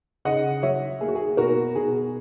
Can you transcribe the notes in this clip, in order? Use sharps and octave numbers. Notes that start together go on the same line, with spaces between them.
C#3 D#5 F#5
F#3 C#5 E5
A#3 G#4
F#4
G#4
B2 F#4 A#4
B2 G#4